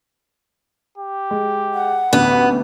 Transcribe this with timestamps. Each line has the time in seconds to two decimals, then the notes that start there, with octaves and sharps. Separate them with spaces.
0.98 G4
1.31 G#3
1.74 F#5
2.13 A1 D2 B3 B4